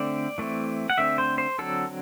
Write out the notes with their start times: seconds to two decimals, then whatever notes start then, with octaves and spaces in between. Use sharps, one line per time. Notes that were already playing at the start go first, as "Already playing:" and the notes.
Already playing: D3 A3 C4 D5
0.38 E3 A3 C4
0.90 F#5
0.98 D3 A3 C4 E5
1.18 C5
1.38 C5
1.58 D3 F#3 C4 A4